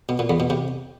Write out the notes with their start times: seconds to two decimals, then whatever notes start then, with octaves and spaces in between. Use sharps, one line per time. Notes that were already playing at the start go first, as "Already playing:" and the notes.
0.09 B2
0.19 A#2
0.30 E2
0.40 B2
0.50 C3